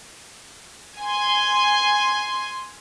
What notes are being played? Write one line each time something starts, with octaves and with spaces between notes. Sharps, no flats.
G#5 C6